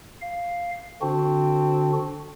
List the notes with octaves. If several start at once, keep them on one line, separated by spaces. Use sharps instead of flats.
F5
D3 C4 D4 F#4